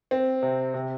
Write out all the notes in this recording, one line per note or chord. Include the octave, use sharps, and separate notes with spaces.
C4
C3
C3